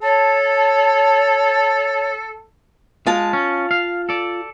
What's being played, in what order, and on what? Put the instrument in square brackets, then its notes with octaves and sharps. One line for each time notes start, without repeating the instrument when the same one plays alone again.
[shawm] A4 [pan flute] C#5 [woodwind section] A5
[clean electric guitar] G#3 [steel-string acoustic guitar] F4 A5
[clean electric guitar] C#4
F5
A4 D5